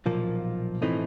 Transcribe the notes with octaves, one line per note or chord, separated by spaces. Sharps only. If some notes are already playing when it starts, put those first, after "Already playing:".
B1 A#2 F3 A#3
A2 E3 A3 C4 D#4